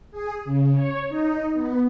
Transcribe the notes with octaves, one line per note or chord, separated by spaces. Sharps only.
G#4
C#3
C#5
D#4
B3